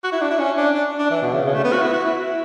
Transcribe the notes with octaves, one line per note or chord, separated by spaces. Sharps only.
F#4
E4
D4
E4
C#4
D4
D4
D4
E3
B2
C#3
C#3
A3
B3
F#4
E4
F#4
E4